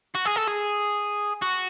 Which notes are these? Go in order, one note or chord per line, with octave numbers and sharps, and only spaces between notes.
F#4
G#4
A4
G#4
F#4